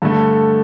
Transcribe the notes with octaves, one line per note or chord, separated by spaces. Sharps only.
G2 D3 A3